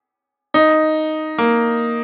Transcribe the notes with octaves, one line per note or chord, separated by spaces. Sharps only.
D#4
A#3